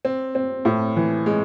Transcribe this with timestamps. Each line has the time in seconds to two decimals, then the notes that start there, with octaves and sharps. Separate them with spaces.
0.05 C4
0.35 C4
0.65 A2
0.96 E3
1.26 G#3